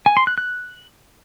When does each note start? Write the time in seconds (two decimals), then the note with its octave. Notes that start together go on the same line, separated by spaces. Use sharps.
0.06 G#5
0.17 C6
0.27 F#6
0.38 F#6